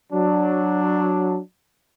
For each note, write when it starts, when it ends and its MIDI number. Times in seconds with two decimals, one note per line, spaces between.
0.12 1.38 54
0.12 1.38 62